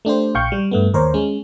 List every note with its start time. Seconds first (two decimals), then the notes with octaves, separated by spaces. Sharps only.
0.05 A3 D4 G4 C5
0.35 A#1 F5 G5 C#6 G6
0.52 G3
0.71 G2 A3 B3
0.94 D#2 A#4 C5 C#5
1.14 G#3 C#4